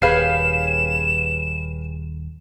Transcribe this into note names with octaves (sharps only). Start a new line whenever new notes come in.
D#1 G4 G#4 B4 C#5 F5 C7 E7